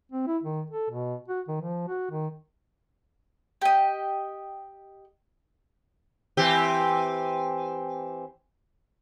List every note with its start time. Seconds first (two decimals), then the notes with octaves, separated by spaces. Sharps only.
0.12 C4
0.27 E4
0.43 D#3
0.70 A4
0.90 B2
1.28 F#4
1.48 D#3
1.62 F3
1.88 F#4
2.11 D#3
3.61 G4 D#5
6.37 E3 C4 G4